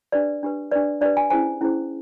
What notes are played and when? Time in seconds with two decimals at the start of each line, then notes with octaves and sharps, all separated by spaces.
0.12 D4 G4 B4 D5
0.43 D4 G4 B4
0.71 D4 G4 B4 D5
1.01 D4 G4 B4 D5
1.17 G#5
1.30 C#4 E4 G#4 C5 G#5
1.61 C#4 E4 G#4 C5